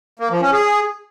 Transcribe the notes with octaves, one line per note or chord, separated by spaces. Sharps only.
A#3
F3
C#4
G#4